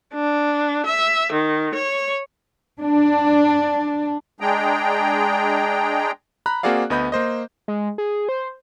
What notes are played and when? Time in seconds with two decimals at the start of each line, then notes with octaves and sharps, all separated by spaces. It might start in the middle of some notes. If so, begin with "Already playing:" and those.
0.14 D4
0.86 E5
1.31 D#3
1.74 C#5
2.81 D4
4.41 G#3 D4 G#4 G5 A#5
6.46 A#5 B5 F#6
6.63 A#3 C4 F#4 G#4 D5 F5
6.90 D2 B3 D#5 B5 G6
7.12 A#3 C5 D#5
7.68 G#3
7.98 G#4
8.29 C5